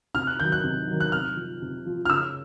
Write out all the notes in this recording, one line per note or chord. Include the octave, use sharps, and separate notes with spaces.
C3 F6
F#6
D#3 F#3 G6
F#6
C3
D#3 F#3
F#6
C3 F6
F3
C3
F3
F6
C#3 E6